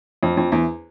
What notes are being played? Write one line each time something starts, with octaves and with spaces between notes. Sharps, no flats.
F2
F2
E2